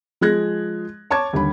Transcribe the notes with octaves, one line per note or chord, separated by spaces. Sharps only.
F3 G#3 G#4 F#6 G#6 A#6
C#5 A5 C#6 D6 G#6
D#2 D3 G3 B5